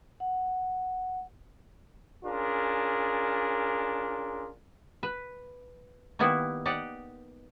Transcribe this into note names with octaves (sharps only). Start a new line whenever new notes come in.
F#5
C#4 D4 F4 G#4 A#4
B4
D#3 G3 A#3 B3 E4
D#4 G4 D5 F#5